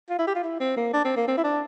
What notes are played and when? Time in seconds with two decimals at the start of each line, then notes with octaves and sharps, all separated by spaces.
0.10 F4
0.19 E4
0.27 G4
0.35 F4
0.44 E4
0.60 C4
0.77 A#3
0.93 D4
1.05 C4
1.17 A#3
1.28 C4
1.37 E4
1.44 D4